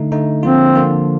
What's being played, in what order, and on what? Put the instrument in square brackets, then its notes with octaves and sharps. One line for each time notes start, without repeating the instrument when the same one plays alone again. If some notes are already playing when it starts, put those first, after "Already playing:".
Already playing: [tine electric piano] D3 A3 D#4
D3 A3 D#4
[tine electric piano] D3 F3 A#3 F4 [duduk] C4
[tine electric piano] D3 F3 A#3 F4